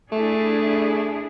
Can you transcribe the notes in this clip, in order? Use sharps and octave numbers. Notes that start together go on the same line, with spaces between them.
A3 D4 E4 G#4